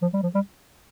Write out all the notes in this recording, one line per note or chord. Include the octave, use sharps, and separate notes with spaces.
F3
G3
F3
G3